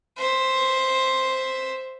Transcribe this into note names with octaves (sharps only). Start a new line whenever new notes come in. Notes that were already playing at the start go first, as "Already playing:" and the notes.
C5 E5